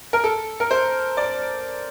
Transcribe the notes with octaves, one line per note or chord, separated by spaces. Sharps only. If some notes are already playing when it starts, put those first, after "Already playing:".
A#4
A4
A#4
C5
D5